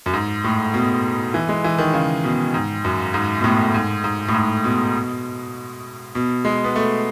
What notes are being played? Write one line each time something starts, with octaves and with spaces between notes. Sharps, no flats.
F#2
G#2
A2
B2
E3
G#3
E3
D#3
C#3
B2
G#2
F#2
G#2
B2
A2
G#2
G#2
A2
G#2
B2
B2
G#3
B3
A3